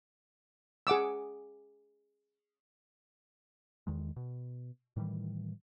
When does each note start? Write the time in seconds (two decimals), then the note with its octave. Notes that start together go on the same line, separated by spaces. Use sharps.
0.87 G#4 F#5 D6 E6
3.87 E2 D#3 G#3
4.16 B2
4.96 A2 D#3 E3 G3